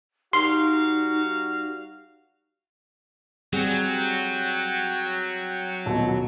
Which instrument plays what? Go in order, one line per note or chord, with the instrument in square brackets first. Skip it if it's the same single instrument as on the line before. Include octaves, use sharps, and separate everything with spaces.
[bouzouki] G3 A#4 [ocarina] D#4 [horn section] F#4 F5 [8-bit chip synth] C6
[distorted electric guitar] F#3 [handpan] G3 C4 G#4 [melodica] F#5 G5
[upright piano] D#1 B2